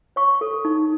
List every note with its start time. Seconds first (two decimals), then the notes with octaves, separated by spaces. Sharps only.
0.16 C#5 C#6
0.41 A4
0.65 D#4